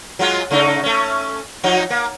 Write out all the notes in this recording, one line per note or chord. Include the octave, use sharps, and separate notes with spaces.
F#3 G#3 F4
C#3 A3 D#4
A3 C#4
F3 F#3 D#4
A#3